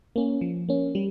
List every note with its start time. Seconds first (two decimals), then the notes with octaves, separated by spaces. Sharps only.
0.16 A#3 C#4
0.41 F3
0.69 A#3 C#4
0.95 G3